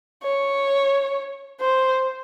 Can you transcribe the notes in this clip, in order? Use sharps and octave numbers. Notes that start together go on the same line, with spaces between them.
C#5
C5